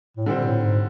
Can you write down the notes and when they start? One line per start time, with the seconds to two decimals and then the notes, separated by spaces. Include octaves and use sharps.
0.17 A2
0.26 A#2 D3 G3 C4
0.45 A2
0.62 G#2